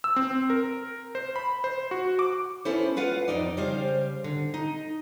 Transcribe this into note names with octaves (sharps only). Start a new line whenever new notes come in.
E6
C4
A#4
C5
B5
C5
F#4
D6
B3 C#4 E4 A4 C5
F4 B4 F5 F#5
F2 D#4 D5
C#3 G3 C5 F5
D3
D#4